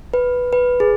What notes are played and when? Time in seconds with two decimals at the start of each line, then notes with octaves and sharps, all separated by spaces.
0.14 B4
0.53 B4
0.80 G#4